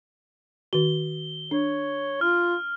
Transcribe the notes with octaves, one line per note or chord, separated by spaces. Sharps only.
D#3 F#4 G7
D4 C#5
F4 F6